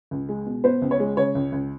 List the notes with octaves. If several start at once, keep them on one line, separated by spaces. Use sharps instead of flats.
C#2
G#3
B2
B3 C5
C#2
C#5
G#3
C#3 C#5
C#2
C#2